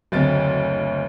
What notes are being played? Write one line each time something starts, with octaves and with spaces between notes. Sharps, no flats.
F#1 D2 F#3 A3 C4 C#5 D#5 A6